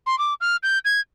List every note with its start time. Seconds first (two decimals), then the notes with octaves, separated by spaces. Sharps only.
0.06 C6
0.18 D6
0.41 F6
0.63 G6
0.85 G#6